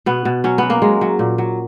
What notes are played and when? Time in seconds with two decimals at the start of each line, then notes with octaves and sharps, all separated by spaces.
0.06 B2 B3
0.25 B2
0.44 F#3 C#4
0.58 F#3 B3
0.70 A#3
0.82 F#3 G#3
1.01 F#3
1.19 A#2
1.38 F#3